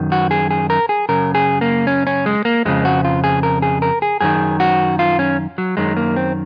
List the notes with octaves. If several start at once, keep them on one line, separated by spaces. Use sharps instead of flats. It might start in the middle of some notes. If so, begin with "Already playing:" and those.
Already playing: F#2 D#3
F#4
G#4
G#4
A#4
G#4
F#2 C#3 A#4
G#4
A#3
C#4
C#4
G#3
A#3
F2 C#3 G#3
F#4
F4
G#4
A#4
G#4
A#4
G#4
F#2 D#3 G#4
F#4
F4
C#4
F#3
F#2 D#3 G#3
A#3
C4